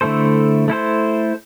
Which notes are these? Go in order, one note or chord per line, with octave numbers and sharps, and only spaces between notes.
D3 A3 E4 A4 C5
A3 E4 A4 C5